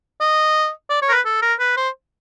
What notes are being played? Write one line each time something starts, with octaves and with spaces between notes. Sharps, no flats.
D#5
D5
C#5
A#4
B4
A4
A#4
B4
C5